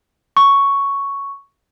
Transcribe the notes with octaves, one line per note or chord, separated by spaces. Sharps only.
C#6